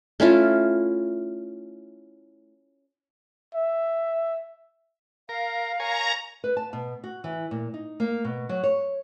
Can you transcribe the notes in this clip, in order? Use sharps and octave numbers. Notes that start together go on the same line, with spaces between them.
A3 C#4 E4 F4
E5
A#4 F5
A#4 C#5 G#5 A#5
B4
A5
B2
F#4
E3
A#2
D#4
A#3
B2
F#3
C#5